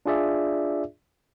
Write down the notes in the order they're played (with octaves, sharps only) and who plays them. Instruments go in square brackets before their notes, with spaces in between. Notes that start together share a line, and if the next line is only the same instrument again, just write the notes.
[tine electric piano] D4 F4 G#4 D5 E5